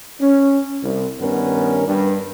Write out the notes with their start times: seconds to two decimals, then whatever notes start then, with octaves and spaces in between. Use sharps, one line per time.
0.20 C#4
0.83 C2
1.20 G2 D#3 B3 C#4 A#4
1.87 G2